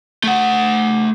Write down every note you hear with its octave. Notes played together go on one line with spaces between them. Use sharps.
A3 F#5